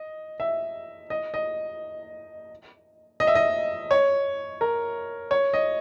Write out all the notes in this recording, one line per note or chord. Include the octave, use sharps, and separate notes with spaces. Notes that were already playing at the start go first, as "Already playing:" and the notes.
Already playing: D#5
E5
D#5
D#5
D#5
E5
D#5
C#5
A#4
C#5
D#5